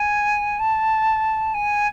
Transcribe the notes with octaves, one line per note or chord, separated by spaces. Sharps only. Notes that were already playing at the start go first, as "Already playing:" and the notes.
Already playing: G#5
A5
G#5